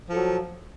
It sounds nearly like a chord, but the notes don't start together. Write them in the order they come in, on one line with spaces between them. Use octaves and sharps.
F3 A4 F#3